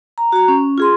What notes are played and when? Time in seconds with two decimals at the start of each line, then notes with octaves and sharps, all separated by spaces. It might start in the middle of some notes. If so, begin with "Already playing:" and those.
0.18 A#5
0.32 F#4 A#5
0.48 C#4
0.78 F4 G#4 C6